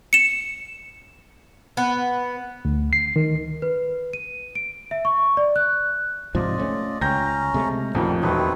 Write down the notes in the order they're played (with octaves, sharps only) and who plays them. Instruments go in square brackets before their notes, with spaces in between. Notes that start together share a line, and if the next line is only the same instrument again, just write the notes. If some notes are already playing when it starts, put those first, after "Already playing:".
[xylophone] C#7 E7
[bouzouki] B3
[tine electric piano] D2
C7
D#3
[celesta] B4
D#7
D7
E5
C#6
D5
F#6
[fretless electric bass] G#2 C3 F3 [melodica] F4 D5 D#5
[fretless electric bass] A3 B3 C#4
[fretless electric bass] C#2 [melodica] C#4 A#5 [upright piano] G5 G6 A#6
[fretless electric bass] C3 G#3 A3
[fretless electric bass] A1 A#2 D#3 [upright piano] F2 [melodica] F#3 G3
[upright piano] E1 [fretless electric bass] D#3 [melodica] A3 C4 B4